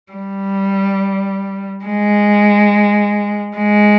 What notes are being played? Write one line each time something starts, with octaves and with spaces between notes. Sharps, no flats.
G3
G#3
G#3